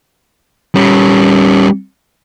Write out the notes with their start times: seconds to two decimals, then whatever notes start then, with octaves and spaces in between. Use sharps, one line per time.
0.75 G3 C#4